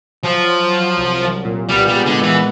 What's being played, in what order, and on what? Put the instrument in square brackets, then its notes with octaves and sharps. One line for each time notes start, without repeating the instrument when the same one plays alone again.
[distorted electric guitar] F3 [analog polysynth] F#3
[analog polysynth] F#3
F#3
C2
C2
A#2
[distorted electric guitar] G3 [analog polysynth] B3
[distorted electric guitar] G3
[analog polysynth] G#3
[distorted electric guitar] D3
[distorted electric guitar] E3 [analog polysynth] B3